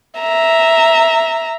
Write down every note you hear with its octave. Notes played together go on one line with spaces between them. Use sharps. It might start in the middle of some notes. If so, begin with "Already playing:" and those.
E5 A#5